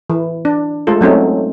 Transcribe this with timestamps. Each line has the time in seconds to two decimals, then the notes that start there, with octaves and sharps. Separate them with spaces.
0.10 E3
0.45 D4
0.87 G#3 A3 F4 A4
1.01 F#3 A3 C4 C#4 D#4